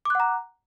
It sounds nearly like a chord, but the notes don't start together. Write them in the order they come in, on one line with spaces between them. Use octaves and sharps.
D6 F#6 F#5 A#5